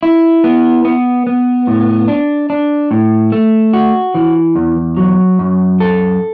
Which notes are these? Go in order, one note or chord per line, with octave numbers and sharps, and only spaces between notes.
E4
B3
B3
B3
A2
D4
D4
A2
A3
F#4
E3
E2
F#3
F#2
A4